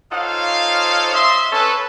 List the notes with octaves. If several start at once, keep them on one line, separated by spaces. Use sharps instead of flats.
D#4 F4 A4 C5 C#5 F5
D#5 E5 C6
C#4 A4 B4